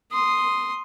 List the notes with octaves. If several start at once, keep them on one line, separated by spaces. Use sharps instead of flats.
C6 D#6